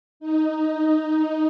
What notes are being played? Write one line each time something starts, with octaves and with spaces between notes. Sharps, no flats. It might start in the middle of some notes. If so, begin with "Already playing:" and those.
D#4